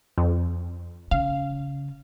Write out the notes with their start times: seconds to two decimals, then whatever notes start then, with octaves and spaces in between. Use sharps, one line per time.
0.18 F2
1.11 C#3 F5